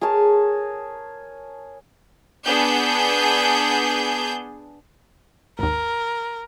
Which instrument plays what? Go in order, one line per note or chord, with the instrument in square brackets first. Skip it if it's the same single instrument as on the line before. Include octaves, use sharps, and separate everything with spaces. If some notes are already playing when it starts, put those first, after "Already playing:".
[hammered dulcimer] G#4 A#4 C#5 A5
[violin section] B3 D4 G#4 G6
[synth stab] G#1 D#2 [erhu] A#4